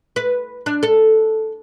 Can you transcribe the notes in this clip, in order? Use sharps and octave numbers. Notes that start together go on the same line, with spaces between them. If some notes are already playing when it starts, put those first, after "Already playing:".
B4
D4
A4